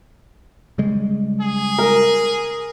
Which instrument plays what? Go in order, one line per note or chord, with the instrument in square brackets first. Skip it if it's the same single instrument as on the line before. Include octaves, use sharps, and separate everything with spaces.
[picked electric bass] C#3 G3 G#3
[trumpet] G#4
[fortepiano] A#4